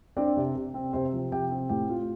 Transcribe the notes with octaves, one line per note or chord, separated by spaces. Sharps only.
C4 D4 D5
C3
C3
C4
C3 C4 C5
F3
C3 G4 G5
C4
A2 G4 G5
F4